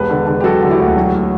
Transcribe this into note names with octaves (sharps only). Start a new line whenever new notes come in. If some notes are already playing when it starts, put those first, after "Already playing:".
Already playing: E1 G4 B4
D3
D3
G4
F#3 F#4 A4
D3
E4 G4
D2
F#3